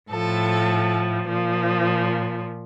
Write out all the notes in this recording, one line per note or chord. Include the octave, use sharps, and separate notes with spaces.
A2 F3 A4
A#2 F3